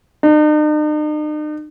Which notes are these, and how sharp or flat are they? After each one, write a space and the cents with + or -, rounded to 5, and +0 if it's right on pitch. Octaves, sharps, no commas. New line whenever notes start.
D#4 -45